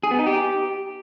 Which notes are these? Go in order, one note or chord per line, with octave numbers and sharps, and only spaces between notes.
G#4
B3
D#4
G4